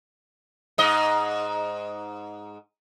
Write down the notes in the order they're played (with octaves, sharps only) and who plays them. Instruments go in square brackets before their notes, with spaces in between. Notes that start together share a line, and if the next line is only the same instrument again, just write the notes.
[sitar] G#2 D#5